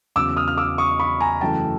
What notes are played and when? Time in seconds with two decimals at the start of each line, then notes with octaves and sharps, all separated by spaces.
0.16 E2 C#3 F#3 D6 E6
0.37 D#6 F6
0.48 F6
0.57 D6 E6
0.78 C#6 D#6
0.99 B5 C#6
1.20 G#5 A#5
1.41 F#2 C#3 E3 A3 G5 A5